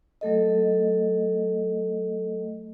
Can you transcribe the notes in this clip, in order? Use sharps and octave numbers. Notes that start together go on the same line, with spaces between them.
F#3 A3 A4 D#5